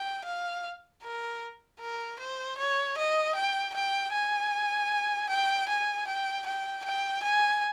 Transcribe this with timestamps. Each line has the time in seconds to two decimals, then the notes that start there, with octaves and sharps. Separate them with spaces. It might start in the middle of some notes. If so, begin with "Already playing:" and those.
Already playing: G5
0.25 F5
1.03 A#4
1.80 A#4
2.20 C5
2.58 C#5
2.97 D#5
3.36 G5
3.74 G5
4.13 G#5
5.29 G5
5.69 G#5
6.07 G5
6.46 G5
6.85 G5
7.23 G#5